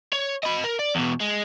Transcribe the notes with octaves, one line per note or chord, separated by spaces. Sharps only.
C#5
D#5 B5
A#4
D5
E2 B2
G#3